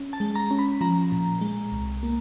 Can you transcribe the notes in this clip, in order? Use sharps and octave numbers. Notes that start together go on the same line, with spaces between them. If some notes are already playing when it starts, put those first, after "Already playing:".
Already playing: C#4
A5
G#3
A#5
C#4
B5
F3 A#5
A#2
G#3
C2
A#3